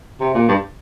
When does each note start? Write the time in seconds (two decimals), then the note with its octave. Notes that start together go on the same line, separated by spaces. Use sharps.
0.20 C3
0.34 A#2
0.49 G2